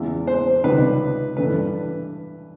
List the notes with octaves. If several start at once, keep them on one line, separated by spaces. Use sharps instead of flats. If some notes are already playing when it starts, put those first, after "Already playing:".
Already playing: E2 C#3 E3 G#3
C5
C#2 C3 D#3 G3 B4
G2 E3 A3 D4 B4